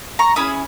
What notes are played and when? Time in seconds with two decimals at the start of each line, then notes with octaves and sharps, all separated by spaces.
0.19 A#5 C#6
0.36 C#4 E4 G#4 B5 D#6